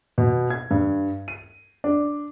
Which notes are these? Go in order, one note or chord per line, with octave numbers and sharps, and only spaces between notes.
B2
G#6
G2
D#7
D4